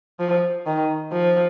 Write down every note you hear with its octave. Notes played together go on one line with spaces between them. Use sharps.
F3
D#3
F3